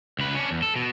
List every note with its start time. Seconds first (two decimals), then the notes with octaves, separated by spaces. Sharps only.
0.19 C#2 B4
0.35 C#4 D4
0.51 E2
0.63 A4
0.76 B2